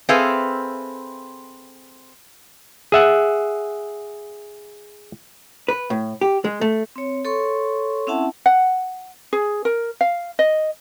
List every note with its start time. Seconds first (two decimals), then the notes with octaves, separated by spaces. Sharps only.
0.09 C4 G#4 A4 B4 E5 F5
2.92 G#4 E5 F#5
5.68 B4
5.90 A2
6.21 G4
6.45 G#3
6.61 A3
6.96 C4 C#5
7.25 A4 C#5 C6 C#6
8.07 C4 C#4 E4 E5 F#5 A5
8.46 F#5
9.33 G#4
9.65 A#4
10.01 F5
10.39 D#5